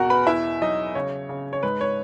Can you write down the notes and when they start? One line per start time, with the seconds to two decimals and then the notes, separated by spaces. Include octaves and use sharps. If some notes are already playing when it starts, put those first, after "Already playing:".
Already playing: E2 B2 F#4 A#4 F#5
0.10 B4 B5
0.27 E2 E4 E5
0.62 F#3 D#4 D#5
0.95 C#3 C#5
1.29 C#3
1.53 C#5
1.63 G#2 B4
1.81 C#5